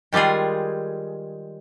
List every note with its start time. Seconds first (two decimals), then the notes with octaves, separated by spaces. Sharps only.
0.13 D#3 G3 G#3 F4 G#4